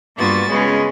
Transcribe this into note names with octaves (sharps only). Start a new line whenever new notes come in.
G2 A#3 B3 F4 F#4 A6
C#3 G#3 B3 C#4